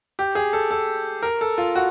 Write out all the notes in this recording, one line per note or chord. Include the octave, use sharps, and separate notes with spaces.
G4
G#4
A4
A4
A#4
A4
F4
F#4